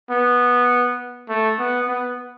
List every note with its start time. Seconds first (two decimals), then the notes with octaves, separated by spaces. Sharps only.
0.10 B3
1.29 A3
1.59 B3
1.88 B3